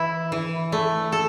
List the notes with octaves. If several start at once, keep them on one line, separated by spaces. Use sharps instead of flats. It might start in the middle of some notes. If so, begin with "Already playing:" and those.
Already playing: E3 E4
E3
A3
A4